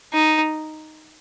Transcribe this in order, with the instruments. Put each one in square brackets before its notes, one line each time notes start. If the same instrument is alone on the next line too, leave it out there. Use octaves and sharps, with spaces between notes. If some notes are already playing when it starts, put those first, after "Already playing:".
[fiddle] D#4